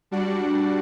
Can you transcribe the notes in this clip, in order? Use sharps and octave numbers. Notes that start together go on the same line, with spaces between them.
G3 D4 F#4 D5 F#5